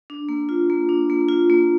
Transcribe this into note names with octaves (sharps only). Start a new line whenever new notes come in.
D4
A#3
F4
A#3
D4
A#3
F4
A#3